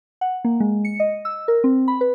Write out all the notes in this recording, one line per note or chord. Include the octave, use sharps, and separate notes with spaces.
F#5
A#3
G#3
C#7
D#5
E6
A#4
C4
B5
B4